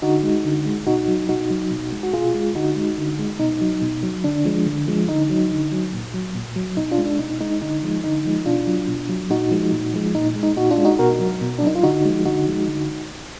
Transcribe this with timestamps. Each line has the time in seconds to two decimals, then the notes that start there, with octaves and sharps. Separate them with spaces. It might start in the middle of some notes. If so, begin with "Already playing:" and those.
0.02 D3 D#4 F#4
0.23 G#3
0.45 D3
0.65 G#3
0.86 B2 D#4 F#4
1.08 F#3
1.29 B2 D#4 F#4
1.50 F#3
1.71 B2
1.92 G#3
2.03 F#4
2.13 B2 F4 G#4
2.34 G#3
2.55 D3 D#4 F#4
2.76 G#3
2.98 D3
3.19 G#3
3.39 B2 D#4
3.61 F#3
3.82 B2
4.03 F#3
4.24 D3 D4
4.45 F3 G#3
4.66 D3
4.88 F3 G#3
5.08 D3 D#4
5.30 F#3
5.51 D3
5.72 F#3
5.93 A#2
6.14 F#3
6.35 A#2
6.56 F#3
6.77 B2 D#4
6.91 D4 F4
6.98 G#3
7.05 D4
7.19 B2 D#4
7.40 G#3 D#4
7.62 D3 D#4
7.83 F3 G#3
8.04 D3 D#4
8.25 F3 G#3
8.46 B2 D4 F4
8.67 F#3
8.88 B2
9.09 F#3
9.30 A#2 D#4 F#4
9.51 F3 G#3
9.72 A#2
9.93 F3 G#3
10.15 A#2 D#4
10.36 G#3
10.43 D#4
10.56 A#2 D#4 F#4
10.71 D4 F4
10.77 G#3
10.85 D#4 F#4
10.99 B2 F#4 A#4
11.20 F#3
11.41 B2
11.59 D4
11.62 F#3 D#4
11.75 F4
11.83 D3 D#4 F#4
12.05 F3 G#3
12.25 D3 D#4 F#4
12.47 F3 G#3
12.68 D3